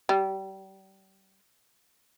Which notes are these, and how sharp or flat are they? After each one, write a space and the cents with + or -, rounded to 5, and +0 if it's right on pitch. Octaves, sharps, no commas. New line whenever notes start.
G3 -30